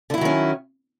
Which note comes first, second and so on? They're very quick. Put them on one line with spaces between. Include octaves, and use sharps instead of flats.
D3 E4 F#3 D#3 C#4